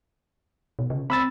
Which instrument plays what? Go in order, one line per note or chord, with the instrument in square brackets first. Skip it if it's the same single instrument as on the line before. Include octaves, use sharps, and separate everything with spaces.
[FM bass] B2
C#3
[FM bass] C4 [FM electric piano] B5 E6 A6